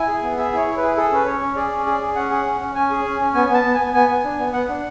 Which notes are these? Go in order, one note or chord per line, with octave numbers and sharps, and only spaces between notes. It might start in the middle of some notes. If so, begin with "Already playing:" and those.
Already playing: E4 G#5
G#4
B3
G#4 E5
E4 C#5
E4
B4
G#4
G#4 A4
C#4 B4
C#4 C#5
C#4
G#4 D5
C#4
G#4
G#4
C#4 F#5
G#4
C#4
C#4
C#4 G#5
G#4
C#4
C#4
B3 G#5
B3
A5
B3
B3 G#5
B3 G#5
B3
D4
B3
B3 F#5
D4